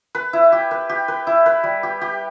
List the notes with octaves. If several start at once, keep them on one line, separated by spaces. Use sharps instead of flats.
B4
E4
G4
B4
G4
B4
E4
B4
G3
G4
G4